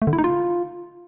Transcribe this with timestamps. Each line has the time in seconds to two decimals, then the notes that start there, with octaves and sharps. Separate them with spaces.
0.02 A3
0.07 D3
0.13 E4
0.18 D#4
0.24 F4